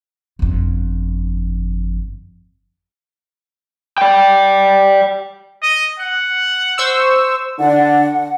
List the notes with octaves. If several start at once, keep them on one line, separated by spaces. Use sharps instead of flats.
G1 F2
D5 G5
D#5
F#5
C5 C#6 E6
D3 D4 F#5